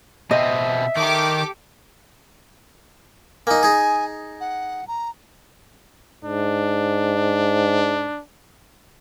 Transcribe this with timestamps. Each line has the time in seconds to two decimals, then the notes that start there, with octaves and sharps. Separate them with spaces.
0.31 B2 C4 D#5 E5
0.97 D#3 G4 A4 D6
3.47 A#3 D#4 G#5
3.63 D#4 G#4
4.40 F#5
4.88 A#5
6.25 G#2 D4